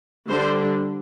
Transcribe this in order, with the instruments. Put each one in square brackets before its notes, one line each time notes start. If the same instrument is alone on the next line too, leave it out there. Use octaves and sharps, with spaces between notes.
[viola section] D3 G3 D4 C5